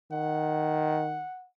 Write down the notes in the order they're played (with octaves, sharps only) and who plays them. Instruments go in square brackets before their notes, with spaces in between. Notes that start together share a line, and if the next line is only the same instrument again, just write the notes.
[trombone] D#3 [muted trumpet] F#5